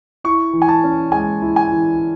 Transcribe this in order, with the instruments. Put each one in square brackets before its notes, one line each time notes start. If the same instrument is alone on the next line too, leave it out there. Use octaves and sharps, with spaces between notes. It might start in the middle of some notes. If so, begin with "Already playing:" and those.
[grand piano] E4 C#6
E3
G#5
A5
C#4
G#3 G#5
E4
G#5
E3